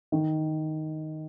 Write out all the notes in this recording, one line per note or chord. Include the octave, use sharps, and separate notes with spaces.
D#3